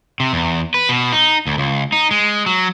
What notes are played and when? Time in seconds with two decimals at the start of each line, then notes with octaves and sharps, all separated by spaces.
0.20 C3
0.33 E2
0.74 B4
0.89 B2
1.13 D#4
1.47 D2
1.58 C#2
1.92 D#4
2.11 G#3
2.46 F#3